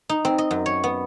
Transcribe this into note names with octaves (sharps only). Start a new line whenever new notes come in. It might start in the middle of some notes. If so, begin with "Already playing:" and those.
D#4
C4
D#5
F#2
C#5
B3